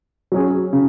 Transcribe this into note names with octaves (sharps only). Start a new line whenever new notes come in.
F#3 C#4 G#4
C#3